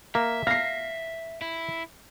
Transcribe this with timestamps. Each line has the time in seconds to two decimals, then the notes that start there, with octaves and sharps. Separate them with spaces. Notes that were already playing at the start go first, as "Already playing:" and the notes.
0.15 A#3 E5
0.47 F5 A#6 C7
1.42 E4